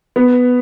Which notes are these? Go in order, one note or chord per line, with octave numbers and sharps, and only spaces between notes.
B3